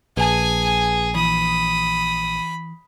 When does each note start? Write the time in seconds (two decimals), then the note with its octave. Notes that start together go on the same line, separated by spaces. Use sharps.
0.17 A#1 G#4 B4 G#5 A5
1.16 E3 B5 D#6